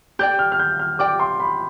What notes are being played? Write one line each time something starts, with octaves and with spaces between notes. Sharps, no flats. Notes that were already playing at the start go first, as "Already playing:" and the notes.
G4 D5 G5 G6
F6
F6
G6
F6
G4 D5 G5 D6
C6
B5